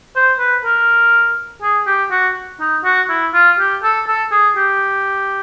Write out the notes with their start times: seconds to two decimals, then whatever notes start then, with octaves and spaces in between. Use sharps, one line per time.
0.15 C5
0.39 B4
0.64 A#4
1.62 G#4
1.86 G4
2.11 F#4
2.60 D#4
2.84 F#4
3.09 E4
3.33 F4
3.59 G4
3.83 A4
4.07 A4
4.32 G#4
4.57 G4